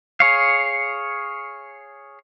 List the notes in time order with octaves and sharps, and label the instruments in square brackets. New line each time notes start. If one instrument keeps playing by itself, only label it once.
[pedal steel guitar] G#4 C#5 F5